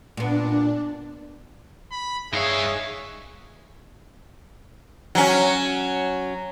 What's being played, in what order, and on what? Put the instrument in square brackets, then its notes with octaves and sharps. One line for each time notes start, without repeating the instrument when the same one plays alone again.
[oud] A#2 B3 [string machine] D4
[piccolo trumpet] B5
[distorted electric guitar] G2 F5 [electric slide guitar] D#4 C#5 [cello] G#4 [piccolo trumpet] E5
[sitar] F#3 C#4